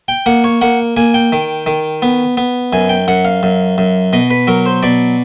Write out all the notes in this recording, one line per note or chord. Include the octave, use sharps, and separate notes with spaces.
G5
A#3 F#5
C#5
A#3 F#5
A#3 G#5
G5
D#3
D#3
B3
B3
F#2 G#5
G5
F#2 F#5
F5
F#2
F#2
B2 D#5
B4
F#3 A#4
C5
B2 D5